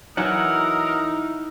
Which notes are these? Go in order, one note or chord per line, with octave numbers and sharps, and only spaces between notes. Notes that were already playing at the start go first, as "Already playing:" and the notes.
E3 F#3 D#4 E4 F#4 A#4 F#5